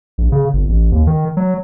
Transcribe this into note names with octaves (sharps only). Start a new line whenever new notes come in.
A#1
C#3
G1
A1
D#2
D#3
F#3